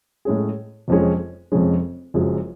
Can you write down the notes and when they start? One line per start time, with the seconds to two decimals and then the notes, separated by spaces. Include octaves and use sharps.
0.25 A2 G#3 C#4 G#4
0.88 F1 F2 F3 G#3 C#4
1.52 F1 F2 F3 G#3 C#4
2.14 F#1 F#2 F3 G#3